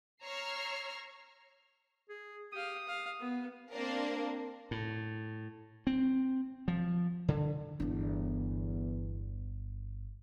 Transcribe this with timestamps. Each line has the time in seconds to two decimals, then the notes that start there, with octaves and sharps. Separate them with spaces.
0.24 C#5 A#5 C#6 E6 F6 C7
2.09 G#4
2.53 G4 F5 D#6
2.87 F5
3.20 B3
3.72 A#3 C4 D4 A#4
4.71 A2
5.87 C4
6.68 F3
7.28 D3
7.80 G1 E2 D4